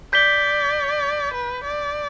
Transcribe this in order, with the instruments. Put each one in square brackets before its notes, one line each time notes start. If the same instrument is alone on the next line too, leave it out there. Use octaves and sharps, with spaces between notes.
[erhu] D5 [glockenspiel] G6 B6 G7
[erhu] B4
D5